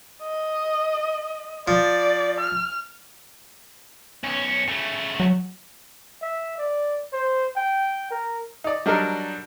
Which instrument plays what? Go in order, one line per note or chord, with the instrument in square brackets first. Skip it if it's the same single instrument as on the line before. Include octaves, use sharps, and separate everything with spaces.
[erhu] D#5
[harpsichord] F3 [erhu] D5
[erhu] F6
[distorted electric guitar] B1 C#4
C#3 A3
[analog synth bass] F#3
[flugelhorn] E5
D5
C5
G5
A#4
[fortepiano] D#4 D5
F#3 G3 D4 D#4 A4 A#4